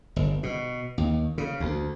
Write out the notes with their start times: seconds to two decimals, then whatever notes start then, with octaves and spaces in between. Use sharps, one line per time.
0.16 G1
0.43 B2
0.98 D#2
1.38 C#3
1.60 D2